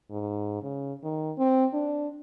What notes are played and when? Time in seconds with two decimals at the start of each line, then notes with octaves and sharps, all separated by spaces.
0.11 G#2
0.63 C#3
1.03 D#3
1.38 C4
1.74 D4